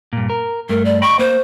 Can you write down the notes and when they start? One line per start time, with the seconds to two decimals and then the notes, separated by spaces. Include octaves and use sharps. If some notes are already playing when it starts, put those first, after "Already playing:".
0.13 G2 A#2
0.30 A#4
0.69 G2 A3 A#4
0.85 D5
1.02 D#5 G5 B5 C#6
1.19 A#3 C5